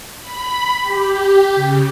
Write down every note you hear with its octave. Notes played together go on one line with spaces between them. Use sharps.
B5
G4
C#3